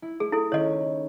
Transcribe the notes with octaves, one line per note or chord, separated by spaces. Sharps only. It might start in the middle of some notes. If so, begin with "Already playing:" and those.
E4
A3 G#4
E4 A4
D#3 C#4 E4 C#5 D#5